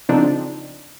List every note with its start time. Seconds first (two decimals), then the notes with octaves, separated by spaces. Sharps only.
0.09 C#3 F3 C4 D4 D#4